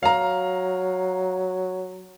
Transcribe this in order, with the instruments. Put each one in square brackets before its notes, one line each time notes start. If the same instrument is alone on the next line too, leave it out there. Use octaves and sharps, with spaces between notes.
[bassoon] F#3 [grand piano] F5 A#5